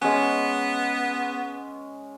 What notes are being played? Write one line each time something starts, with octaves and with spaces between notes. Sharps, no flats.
G#3 B3 C#4